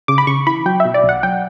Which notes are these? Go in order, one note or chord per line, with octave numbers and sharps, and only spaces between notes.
C#3 D6
B5
C#3 C#6
E3 B5
F#3 G5
B2 E5
D5
B1
F#5
F#3 G5